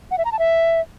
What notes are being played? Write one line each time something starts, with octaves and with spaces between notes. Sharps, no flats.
F#5
E5
A#5
A5
E5